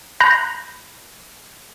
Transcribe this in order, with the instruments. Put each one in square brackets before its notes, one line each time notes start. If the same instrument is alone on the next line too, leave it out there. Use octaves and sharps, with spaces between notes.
[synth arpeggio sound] A#5 B5 F#6 G6 A#6